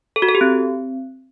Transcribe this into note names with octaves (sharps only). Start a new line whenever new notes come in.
A4
F#4
A4
G4
C4